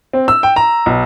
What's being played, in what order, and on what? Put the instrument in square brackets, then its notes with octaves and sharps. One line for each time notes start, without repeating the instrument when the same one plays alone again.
[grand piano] C4
E6
G5
A#5
B1